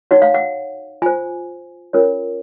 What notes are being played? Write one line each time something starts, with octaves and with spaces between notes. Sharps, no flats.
D#4 F#4 C#5 F#5
F5
F#5
F4 C5 G#5
C#4 F4 A#4 C#5